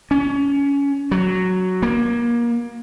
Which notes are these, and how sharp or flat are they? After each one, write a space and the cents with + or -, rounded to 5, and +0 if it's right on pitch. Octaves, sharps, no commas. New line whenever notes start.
C#4 +20
F#3 +0
A#3 +25